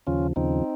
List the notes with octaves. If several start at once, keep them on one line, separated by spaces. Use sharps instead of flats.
D#2 C#3 F3 C#4 F4
D#2 C#3 F3 C4 D#4